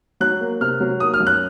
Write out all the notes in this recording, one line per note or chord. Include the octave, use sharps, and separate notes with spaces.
F#3 F#6
A#3
C3 F6
F#3
A#3 D#6
F6
F#2
F#6